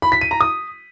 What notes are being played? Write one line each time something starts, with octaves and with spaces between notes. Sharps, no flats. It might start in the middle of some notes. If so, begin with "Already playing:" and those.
B5
B6
D#7
A#5
D#6